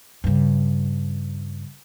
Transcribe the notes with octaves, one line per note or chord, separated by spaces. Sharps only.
G2 C#3